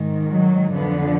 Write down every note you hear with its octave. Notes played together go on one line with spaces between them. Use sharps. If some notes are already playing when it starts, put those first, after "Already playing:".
Already playing: G#2 D#3
F#3
F2 D3 F3 B3